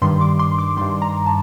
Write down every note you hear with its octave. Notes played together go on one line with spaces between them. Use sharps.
G2 D#3 G3 C6
D6
C6
D6
G2 D#3 G3 C6
A#5
A5